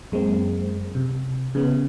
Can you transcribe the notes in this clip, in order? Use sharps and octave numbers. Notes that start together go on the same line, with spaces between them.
F#2 G#3 A#3 C4
C3
C#3 B3